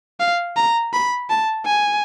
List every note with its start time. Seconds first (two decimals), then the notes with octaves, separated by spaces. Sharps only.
0.20 F5
0.56 A#5
0.93 B5
1.30 A5
1.66 G#5